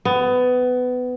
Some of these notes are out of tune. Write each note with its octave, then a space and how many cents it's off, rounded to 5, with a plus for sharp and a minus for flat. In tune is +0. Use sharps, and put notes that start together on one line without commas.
B3 +20